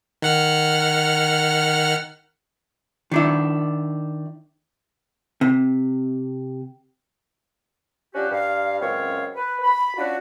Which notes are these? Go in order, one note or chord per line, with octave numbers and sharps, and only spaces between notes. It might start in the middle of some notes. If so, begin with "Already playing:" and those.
D#3 F#5 F6
D#3 D4 E4
C3
F3 C#4 D4 F#4 G4
G2 F5
C#2 F#2 C4 C#5 F5
B4
B5
C#4 D4 F4 F#4